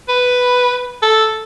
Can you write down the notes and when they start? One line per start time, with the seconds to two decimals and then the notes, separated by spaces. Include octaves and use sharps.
0.08 B4
1.02 A4